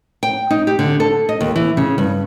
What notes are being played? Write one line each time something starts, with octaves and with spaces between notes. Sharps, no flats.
G5
D#4
G4
D3
A4
D#5
D#2
E3
C#3
G2